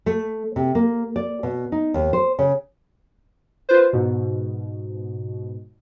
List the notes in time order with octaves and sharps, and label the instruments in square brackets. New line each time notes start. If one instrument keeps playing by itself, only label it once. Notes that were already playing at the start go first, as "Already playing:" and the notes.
[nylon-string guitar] A3
C3
A#3
D5
B2
D#4
D#2
C5
C#3
[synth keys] F4 B4 C5
G#2 B2